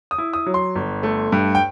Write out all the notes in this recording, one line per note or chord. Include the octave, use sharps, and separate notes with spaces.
D#6
E4
D#6
F#3
C6
G1
A3
G2
G5